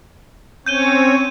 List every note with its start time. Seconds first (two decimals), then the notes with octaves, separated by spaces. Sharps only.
0.66 C4 C#4 C#5 G6 D#7 G7